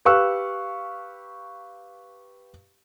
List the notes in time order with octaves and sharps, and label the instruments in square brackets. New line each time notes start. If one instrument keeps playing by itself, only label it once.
[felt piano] G4 B4 F5 C#6 E6 F#6